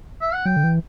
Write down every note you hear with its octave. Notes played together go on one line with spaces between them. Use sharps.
E5
F#5
F#3 G5
D3
E3